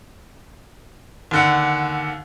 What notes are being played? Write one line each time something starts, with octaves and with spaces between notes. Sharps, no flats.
D#2 D3 F#5